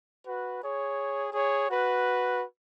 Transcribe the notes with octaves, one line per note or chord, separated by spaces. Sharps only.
F#4 B4
G#4 C#5
G#4 C#5
F#4 B4